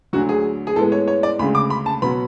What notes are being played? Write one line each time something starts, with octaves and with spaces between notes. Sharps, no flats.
D2 D3 F#3 F#4
G#4
G#4
A2 G#3 B3 A4
C#5
C#5
D5
D2 C#3 G#3 B5
D6
B5
A5
B2 F#3 B3 B5